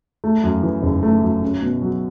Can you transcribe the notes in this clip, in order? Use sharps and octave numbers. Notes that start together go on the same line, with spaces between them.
A3
F#2
E3
F#1
A3
F#2
C#4
B2
F#3